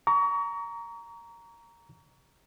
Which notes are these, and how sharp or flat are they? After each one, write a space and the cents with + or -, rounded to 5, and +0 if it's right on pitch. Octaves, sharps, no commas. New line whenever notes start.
A#5 +0 C#6 +35